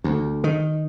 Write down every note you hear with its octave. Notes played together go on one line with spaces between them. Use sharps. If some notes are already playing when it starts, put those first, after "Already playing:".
D2
D#3